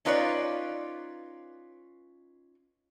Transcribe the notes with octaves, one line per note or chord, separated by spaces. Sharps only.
C#4 D#4 F4 B4 C#5 D5